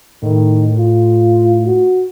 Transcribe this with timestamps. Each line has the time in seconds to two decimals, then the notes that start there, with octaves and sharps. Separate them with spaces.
0.22 A2 D#3
0.78 F4
1.66 F#4